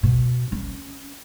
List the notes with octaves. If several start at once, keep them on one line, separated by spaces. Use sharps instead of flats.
B2
C#4